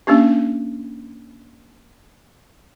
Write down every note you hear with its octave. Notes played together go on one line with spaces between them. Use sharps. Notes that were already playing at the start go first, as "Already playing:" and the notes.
A#3 C#4 D4 G4